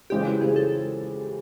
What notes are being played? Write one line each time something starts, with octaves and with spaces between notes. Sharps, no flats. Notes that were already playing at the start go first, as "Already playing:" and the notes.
C#3 E3 G#3 C4 F4 G4
F#4
C#3 E3 G#3 C4 F4 G#4
A4